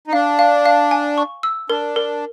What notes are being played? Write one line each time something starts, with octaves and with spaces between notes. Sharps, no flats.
D#4
D4 F5
F5
F5
G#5
C#6
E6
D4 A#4
A#4